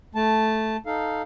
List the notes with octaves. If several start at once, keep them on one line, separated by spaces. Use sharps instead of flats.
A3 A5
D#4 A4 F5